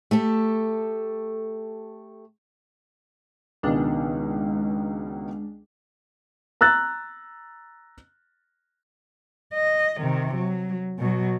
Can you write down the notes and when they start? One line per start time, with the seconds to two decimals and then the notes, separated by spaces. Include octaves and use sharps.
0.11 A3 G4 A4
3.63 C#2 B2 D#3 G#3 D4
6.61 A#5 E6 F#6 A6
9.54 D#5
10.00 C3 D#3
10.35 F#3
10.99 B2 F#3